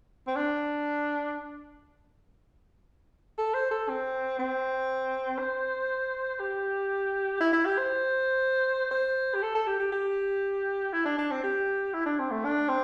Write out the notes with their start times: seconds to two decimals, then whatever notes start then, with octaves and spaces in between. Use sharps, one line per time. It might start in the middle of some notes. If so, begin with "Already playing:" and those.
0.27 C4
0.36 D4
3.38 A4
3.54 C5
3.71 A4
3.89 C4
4.39 C4
5.39 C5
6.40 G4
7.40 E4
7.53 E4
7.65 G4
7.78 C5
8.91 C5
9.34 G4
9.42 A4
9.55 A4
9.67 G4
9.79 G4
9.92 G4
10.93 E4
11.05 D4
11.18 D4
11.31 C4
11.43 G4
11.94 E4
12.06 D4
12.19 C4
12.31 A3
12.44 D4
12.69 C4